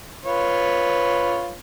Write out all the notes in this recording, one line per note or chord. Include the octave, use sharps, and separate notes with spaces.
F4 B4 C#5